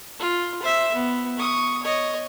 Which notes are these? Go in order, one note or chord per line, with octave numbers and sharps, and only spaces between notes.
F4
C5 E5
B3
C#6 D#6
C#5 D#5